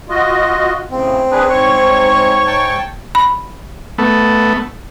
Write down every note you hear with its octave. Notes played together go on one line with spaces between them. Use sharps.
F4 F#4 D#5
A2 C#3 C4
D4 G#4 B4
G#2 C#5 C#6
G5 A5
B5
A3 B3